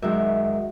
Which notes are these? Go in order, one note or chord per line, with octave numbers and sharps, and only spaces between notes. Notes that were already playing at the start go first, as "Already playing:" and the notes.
F#2 D#3 G#3 D#4 E5